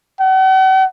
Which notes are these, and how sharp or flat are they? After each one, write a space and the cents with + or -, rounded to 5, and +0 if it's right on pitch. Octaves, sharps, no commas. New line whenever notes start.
F#5 +45